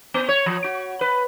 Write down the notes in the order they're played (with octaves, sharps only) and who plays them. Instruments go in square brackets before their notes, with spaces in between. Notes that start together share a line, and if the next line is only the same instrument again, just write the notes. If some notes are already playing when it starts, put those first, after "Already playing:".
[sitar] B3
C#5
F3
F#4
B4